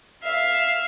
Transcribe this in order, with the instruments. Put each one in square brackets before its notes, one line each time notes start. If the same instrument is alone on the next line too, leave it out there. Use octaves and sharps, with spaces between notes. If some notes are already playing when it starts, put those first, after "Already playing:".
[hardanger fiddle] E5 F5